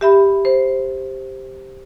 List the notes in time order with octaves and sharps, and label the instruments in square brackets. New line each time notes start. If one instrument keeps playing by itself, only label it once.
[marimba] G4 E5 B5
C5